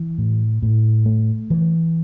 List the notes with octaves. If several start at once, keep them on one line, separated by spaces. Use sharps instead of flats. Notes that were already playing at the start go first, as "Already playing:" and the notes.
Already playing: E3
A2
A2
A3
E3